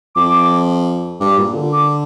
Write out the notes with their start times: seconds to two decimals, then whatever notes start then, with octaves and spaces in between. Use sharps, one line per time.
0.15 F2 D6
1.20 G2 D6
1.38 A#2
1.55 D3
1.72 D6